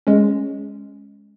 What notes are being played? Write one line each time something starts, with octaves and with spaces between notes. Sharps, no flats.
G#3 C#4